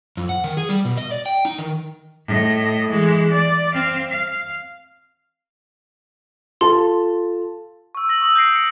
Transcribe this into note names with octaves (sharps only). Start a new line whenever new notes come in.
F2
F#5
D#3
G#4
G3
B2
D#5
D5
G5
D#4
D#3
A2 D#5
E3 G#3
D5
C4 F5
F5
F4 A4 A5 C6
C#6 E6
A#6 F#7
C#6 D#6 E6 A#6 F#7
G6 A#6 C7 D7
C#7